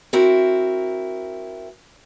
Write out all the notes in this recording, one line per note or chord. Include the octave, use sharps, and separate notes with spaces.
C4 E4 F#4 A#4